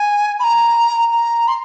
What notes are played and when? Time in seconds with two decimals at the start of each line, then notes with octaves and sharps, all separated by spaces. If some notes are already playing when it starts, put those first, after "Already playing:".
Already playing: G#5
0.40 B5
0.44 A#5
1.12 A#5
1.48 C6